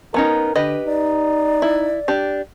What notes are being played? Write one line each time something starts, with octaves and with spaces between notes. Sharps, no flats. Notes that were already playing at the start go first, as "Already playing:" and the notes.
B3 C#4 D#4 A#4
D3 D4 G4 B4 D#5
D#4 D5
E4
D4 G4